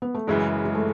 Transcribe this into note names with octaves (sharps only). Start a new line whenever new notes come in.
B3
A3
F#1 F#2 C#3 E3 G#3
G#3
A3